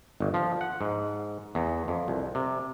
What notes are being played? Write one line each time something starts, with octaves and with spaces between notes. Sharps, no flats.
G1
F3
F#5
G#2
E2
F2
C2
C3